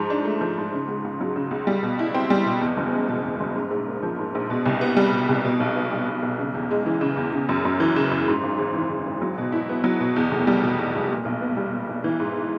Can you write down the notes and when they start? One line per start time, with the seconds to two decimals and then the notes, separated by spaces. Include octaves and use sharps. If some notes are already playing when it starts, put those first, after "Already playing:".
Already playing: G#2 F3
0.10 D4
0.25 A3
0.41 F3
0.58 G#2
0.73 C#3
0.88 C#2
1.05 C#2
1.21 F#3
1.36 C#3
1.51 C#2
1.67 G3
1.83 B2
1.99 E4
2.14 C4
2.30 G3
2.46 B2
2.61 E2
2.77 F#1
2.93 G#3
3.09 B2
3.24 E2
3.40 F#1
3.55 G#2
3.71 A#1
3.88 A#3
4.03 F3
4.18 G#2
4.35 A#1
4.50 B2
4.66 C2
4.81 B3
4.97 G3
5.12 B2
5.29 C2
5.45 B2
5.60 B1
5.76 B3
5.92 G3
6.08 B2
6.23 B1
6.39 C#3
6.54 E2
6.71 G#3
6.86 E3
7.01 C#3
7.17 E2
7.33 C#3
7.49 F#2
7.65 F#2
7.80 E3
7.96 C#3
8.11 F#2
8.28 G#2
8.43 G#1
8.59 G#1
8.74 E3
8.90 G#2
9.06 G#1
9.22 F#3
9.38 B2
9.52 E4
9.69 B3
9.84 F#3
10.00 B2
10.16 E2
10.31 F1
10.47 G3
10.63 B2
10.78 E2
10.95 F1
11.10 A#2
11.25 B1
11.41 B3
11.57 G3
11.73 A#2
11.89 B1
12.04 E3
12.19 G#2